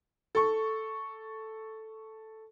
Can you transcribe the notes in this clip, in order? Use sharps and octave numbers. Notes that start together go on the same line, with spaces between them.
A4 C#6